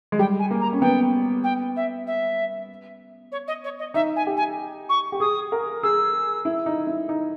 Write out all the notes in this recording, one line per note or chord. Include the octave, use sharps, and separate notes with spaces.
G#3
G3 G5
G#5
A#3
A#5
C#4
B3 G5
G5
E5
E5
C#5
D#5
C#5
D#5
D#4 E5
G#5
G4
G#5
C#6
G4
G#4 D#6
A#4
G#4 E6
E4
D#4
E4
D#4